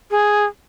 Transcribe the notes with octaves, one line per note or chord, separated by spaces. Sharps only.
G#4